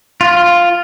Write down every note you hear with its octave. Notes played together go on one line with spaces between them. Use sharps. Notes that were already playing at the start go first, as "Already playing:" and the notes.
F4